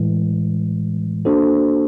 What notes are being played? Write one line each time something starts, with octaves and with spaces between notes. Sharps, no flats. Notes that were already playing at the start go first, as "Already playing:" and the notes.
Already playing: A2 E3 G#3
A#3 D4 F#4 A4 C5